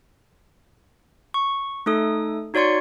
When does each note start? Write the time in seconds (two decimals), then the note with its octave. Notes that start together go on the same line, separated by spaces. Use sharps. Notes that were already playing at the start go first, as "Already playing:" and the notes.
1.34 C#6
1.86 A3 D#4 A4 D#6
2.54 D#4 F#4 C#5 D5 C6 C#7